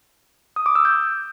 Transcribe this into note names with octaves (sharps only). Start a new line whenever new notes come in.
D#6
D6
E6
G6